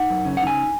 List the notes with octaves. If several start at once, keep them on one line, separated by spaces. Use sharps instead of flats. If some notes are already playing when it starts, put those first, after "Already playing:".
Already playing: D#4 F#5
F#2
C#3
F#5
D#4 G#5